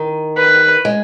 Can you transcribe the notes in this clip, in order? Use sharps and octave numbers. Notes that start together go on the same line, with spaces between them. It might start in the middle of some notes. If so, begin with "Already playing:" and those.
Already playing: D#3
B4
G#3